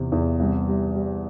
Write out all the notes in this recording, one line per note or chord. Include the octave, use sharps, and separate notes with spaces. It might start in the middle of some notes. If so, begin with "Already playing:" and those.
Already playing: E2 C3
E2
C2
G3
G3